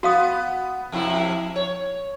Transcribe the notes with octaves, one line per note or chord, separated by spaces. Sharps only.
B3 F#4 F5 D#6
F2 C3 E4
C#5